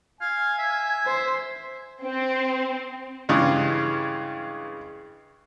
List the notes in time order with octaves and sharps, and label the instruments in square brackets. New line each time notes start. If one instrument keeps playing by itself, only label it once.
[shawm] F5 [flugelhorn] G#5 [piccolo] G#6
[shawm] E5
[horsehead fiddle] C5
[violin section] C4
[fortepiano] G2 C#3 E3 G#3